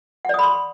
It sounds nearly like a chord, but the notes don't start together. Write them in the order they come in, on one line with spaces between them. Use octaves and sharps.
F#5 D5 D#6 B5 C6